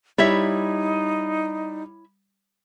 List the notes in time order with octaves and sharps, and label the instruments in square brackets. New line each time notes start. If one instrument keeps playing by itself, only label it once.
[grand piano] G3 [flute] D#4 [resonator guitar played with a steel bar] E4 C#5 E5